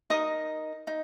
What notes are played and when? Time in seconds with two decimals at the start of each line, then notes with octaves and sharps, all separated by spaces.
0.10 D#4 A#4 D#5 D#6
0.87 D#4